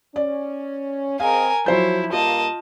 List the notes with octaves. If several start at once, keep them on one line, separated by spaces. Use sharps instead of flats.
C#4 D5
C4 G#4 A#4 D#5 F5 G#5
F3 F#3 E4 C5 G6
G2 G3 A#3 F4 D#5 A5